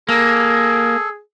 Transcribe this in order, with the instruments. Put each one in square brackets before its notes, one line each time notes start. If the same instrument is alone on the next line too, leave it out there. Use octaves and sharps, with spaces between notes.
[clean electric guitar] A#3 [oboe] G#4 [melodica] A4